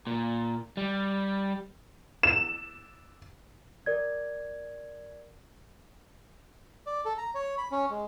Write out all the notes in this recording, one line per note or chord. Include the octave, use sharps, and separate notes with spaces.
A#2
G3
E7
A#4 D5 G#6
D5
A4
A#5
C#5
B5
C#4
G#3